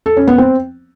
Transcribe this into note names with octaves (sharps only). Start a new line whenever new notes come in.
A4
C#4
B3
C4